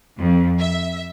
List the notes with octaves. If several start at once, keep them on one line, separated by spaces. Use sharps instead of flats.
F2
E5